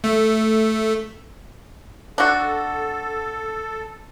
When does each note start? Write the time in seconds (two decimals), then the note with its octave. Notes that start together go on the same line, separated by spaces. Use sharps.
0.04 A3
2.18 D4 F#4 A4